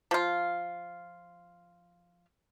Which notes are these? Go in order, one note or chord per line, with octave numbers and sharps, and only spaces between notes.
F3 F4